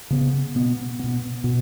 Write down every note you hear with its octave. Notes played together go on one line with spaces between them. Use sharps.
C#3 B3
B2 B3
B2 B3
B2